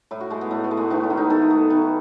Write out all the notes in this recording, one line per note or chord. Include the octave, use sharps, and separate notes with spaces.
A2 E4
F#4
G#3 A3
B3
A2 A3
B3
G#3
A3
D#3 B3
C#4
D#3
D#4
D#3 A4
A3
D#3 B4